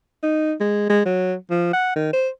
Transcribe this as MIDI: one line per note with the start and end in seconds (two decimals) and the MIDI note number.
0.23 0.53 63
0.60 0.85 56
0.89 1.03 56
1.06 1.35 54
1.51 1.72 53
1.73 1.92 78
1.96 2.12 51
2.13 2.29 72